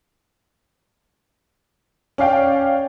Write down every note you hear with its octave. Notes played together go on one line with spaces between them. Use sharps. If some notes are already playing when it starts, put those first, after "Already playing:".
C#4 D5 F5 G5